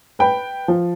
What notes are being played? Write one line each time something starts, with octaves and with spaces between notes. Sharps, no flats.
B4 G5 B5
F3